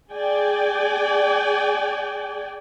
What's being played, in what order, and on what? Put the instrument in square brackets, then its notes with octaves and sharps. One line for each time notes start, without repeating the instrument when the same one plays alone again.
[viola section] G#4 D5 G5 G#5